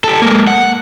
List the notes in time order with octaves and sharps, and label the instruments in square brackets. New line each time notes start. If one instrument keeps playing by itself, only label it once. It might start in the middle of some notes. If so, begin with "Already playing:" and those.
[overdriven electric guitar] G4 A4
G#3 A#3
F#5